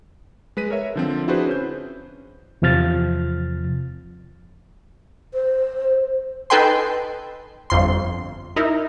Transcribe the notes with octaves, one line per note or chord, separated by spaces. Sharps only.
G#3 B4 B6 D#7
A#4 C#5 E5
D3 F3 C4
D4 E4 F#4 G#4 B4 C5
C#4 G6
E2 C3 F3 F6 A6
C5
D#4 A4 B4 G5 G#5 C6
G1 F2 C6
D#4 E4 A#4